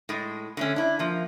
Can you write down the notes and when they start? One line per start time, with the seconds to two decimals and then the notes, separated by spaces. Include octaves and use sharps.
0.09 A2 G#3
0.57 D3 A3 C#4
0.76 D4 E4
0.99 F3 A#3